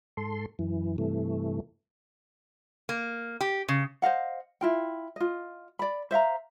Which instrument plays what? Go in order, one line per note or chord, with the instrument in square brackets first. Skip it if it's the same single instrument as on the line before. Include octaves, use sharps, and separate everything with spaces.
[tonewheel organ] G#2 A4 C6
F#2 E3
G2 C3 E3 A3
[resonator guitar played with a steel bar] A#3
G4
C#3
[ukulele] C5 D#5 F5 F#5
E4 F4 G5
F4 D#5
D5 B5
C5 E5 F5 A#5